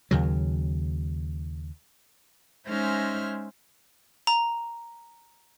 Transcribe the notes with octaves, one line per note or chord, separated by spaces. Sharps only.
D#2 C#3 F#3
G#3 C#4 D#4 C5 E5 F6
A#5